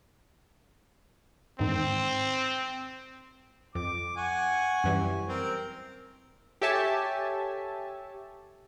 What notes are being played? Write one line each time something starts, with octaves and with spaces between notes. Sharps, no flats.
E2 G#2 D#3 C4
F2 D6
F#5 G#5 C#6
F#2 E3 G3
C4 A#4
G4 A4 C#5 E5 G#5 A5